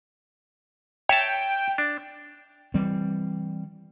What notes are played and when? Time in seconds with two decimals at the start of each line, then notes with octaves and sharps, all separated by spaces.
1.09 C#5 E5 G5 A5
1.78 D4
2.74 E3 G3 C4